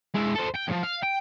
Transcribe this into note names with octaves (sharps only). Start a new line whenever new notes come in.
G#3 E4
A4 C5
G5
E2 F3
F5
G5